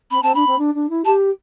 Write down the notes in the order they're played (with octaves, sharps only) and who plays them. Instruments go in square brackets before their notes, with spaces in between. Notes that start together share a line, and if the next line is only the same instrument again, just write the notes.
[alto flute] C4 [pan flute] B5
[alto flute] C4 [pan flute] A5
[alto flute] D4 [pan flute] B5
[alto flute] C4
D4
D4
E4
[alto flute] G4 [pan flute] A5